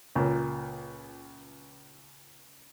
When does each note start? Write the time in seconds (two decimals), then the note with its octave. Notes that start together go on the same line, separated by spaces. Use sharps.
0.15 C#2 A#2